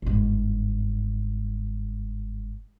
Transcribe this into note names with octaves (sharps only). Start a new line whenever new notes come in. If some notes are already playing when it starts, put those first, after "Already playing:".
G1 G#2